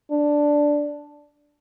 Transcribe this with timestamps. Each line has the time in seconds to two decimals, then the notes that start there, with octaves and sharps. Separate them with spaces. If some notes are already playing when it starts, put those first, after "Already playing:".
0.11 D4